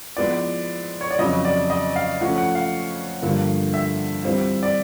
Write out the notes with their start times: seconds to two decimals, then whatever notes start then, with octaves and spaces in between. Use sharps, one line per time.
0.17 F3 G#3 B3 E4 D5
1.01 C#5
1.11 D5
1.19 F2 C#3 F#3 D#5
1.45 D5
1.70 D#5
1.96 F5
2.21 F3 A3 C#4 F4 F#5
2.38 F#5
2.55 F5
3.22 G2 D3 F3 A#3
3.74 E5
4.24 E3 G3 C4 F4
4.63 D5